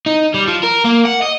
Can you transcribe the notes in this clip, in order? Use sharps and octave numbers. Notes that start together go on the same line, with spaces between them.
D#4
G3
F3
A#4
A#3
F#5
D#5